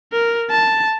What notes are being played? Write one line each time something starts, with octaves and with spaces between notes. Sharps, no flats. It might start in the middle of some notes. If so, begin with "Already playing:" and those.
A#4
A5